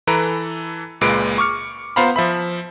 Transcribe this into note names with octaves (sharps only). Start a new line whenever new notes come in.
E3 A4 B4 A#5 D7
C#2 A#2 G#3 B4 D7
C#6 D6 F6 C#7
B3 F4 C5 F5 A#5 B5
F3 E5 B5